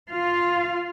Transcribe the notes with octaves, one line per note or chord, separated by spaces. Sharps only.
F4 F5